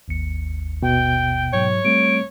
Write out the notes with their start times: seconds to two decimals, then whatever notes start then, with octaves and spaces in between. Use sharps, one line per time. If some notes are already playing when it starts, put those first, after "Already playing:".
0.08 G#1 D#2 C#7
0.82 B2 G5
1.53 G#2 F#3 C#5
1.85 G3 A3 C4 D7